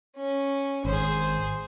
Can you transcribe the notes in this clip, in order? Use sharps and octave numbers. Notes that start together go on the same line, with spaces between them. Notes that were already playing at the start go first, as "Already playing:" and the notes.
C#4
G#1 G#4 C5